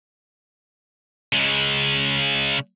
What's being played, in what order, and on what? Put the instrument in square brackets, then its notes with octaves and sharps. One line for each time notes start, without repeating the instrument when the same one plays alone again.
[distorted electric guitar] C#3 G#3